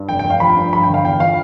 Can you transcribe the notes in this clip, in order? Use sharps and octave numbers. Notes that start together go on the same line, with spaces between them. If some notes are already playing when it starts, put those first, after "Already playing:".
Already playing: G2
F1 G5
G5
F1
F5
F3 B5
G2
G2 B5
G5
D3 F5
E2 G5
F3 F5